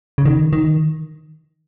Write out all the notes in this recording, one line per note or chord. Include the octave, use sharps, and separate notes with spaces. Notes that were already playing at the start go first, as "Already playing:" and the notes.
C#3
D#3
D#3